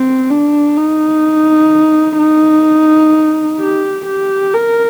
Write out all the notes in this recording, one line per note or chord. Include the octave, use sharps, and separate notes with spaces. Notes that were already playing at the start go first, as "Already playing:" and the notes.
Already playing: C4
D4
D#4
D#4
G4
G4
A#4